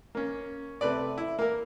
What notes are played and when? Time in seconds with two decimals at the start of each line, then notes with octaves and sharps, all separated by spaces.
0.15 A#3 C#4
0.81 C3 A3 B4 D5
1.18 E4
1.39 A#3 A#4